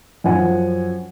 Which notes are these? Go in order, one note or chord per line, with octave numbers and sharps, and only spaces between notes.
F#2 F3 C5 F#5 G#5